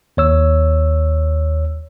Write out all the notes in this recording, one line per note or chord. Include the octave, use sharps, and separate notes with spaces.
D#2 C#5 E6